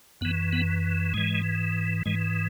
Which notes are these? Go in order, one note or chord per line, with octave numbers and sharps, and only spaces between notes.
F#2 E3 B3
B3
G#2 E3 G#3
G#2 E3 G#3